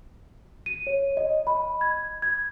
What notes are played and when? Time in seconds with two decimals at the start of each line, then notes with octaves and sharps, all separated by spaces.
0.66 D#7
0.87 C#5
1.17 D#5
1.47 B5
1.81 G#6
2.22 G#6